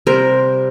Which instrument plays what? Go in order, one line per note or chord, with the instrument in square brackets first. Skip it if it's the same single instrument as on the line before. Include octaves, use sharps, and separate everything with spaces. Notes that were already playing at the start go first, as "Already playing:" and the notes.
[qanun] C3 G3 C4 A#4